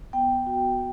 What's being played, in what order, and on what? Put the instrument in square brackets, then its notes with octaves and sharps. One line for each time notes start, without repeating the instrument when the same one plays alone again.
[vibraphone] B3 G5
F#4